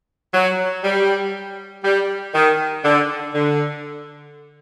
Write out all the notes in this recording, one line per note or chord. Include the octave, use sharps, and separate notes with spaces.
F#3
G3
G3
D#3
D3
D3